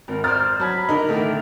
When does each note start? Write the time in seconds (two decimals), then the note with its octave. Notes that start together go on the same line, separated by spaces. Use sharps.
0.08 G#1 A#4
0.24 C5 D5 A#5 C6 D#6 F6 A6
0.60 F#3 A5 B5 G#6
0.89 D3 D#4 A#4
1.09 A2 D3 D#3 A3